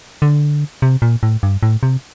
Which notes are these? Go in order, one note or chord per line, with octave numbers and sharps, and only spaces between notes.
D3
C3
A#2
A2
G2
A2
C3